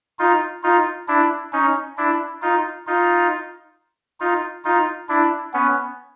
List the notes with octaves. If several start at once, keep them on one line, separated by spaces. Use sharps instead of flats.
D#4 F4
D#4 F4
D4 E4
C#4 D#4
D4 E4
D#4 F4
D#4 F4
D#4 F4
D#4 F4
D4 E4
B3 C#4